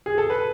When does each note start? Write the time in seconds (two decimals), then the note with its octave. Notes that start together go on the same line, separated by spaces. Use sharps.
0.06 G#4
0.18 A4
0.30 B4